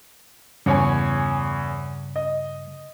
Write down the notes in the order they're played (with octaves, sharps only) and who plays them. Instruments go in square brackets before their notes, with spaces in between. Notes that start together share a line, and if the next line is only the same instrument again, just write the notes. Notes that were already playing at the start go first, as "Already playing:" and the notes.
[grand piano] E2 C#5 G#5 [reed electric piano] G2 C#3
[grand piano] D#5